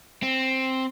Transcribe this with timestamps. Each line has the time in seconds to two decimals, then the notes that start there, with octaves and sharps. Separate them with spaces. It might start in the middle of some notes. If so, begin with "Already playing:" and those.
0.23 C4